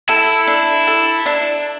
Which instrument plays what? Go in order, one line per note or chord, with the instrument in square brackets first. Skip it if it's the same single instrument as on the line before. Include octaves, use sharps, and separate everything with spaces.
[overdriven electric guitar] E4 [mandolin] A4
[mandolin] D4
A4
D4